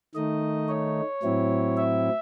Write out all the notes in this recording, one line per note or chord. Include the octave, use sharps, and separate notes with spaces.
D#3 A3 D#4 D#5
C#5
A2 F#3 C4 E4
E5